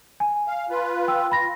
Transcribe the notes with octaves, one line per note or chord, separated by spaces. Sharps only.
G#5
F5
F4 B4
G5 E6
F4 B5 A#6